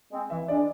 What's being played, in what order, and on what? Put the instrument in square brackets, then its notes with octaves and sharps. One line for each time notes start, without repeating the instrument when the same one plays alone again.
[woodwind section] G#3 C4
[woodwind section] E3 [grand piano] E5
[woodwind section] G#3 D4 [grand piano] D5